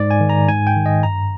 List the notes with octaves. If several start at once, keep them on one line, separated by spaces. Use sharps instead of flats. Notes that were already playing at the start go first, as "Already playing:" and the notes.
Already playing: G#2 D5
G#5
D#3
A#5
G#2 G#5
G5
D#3
D#5
G2 A#5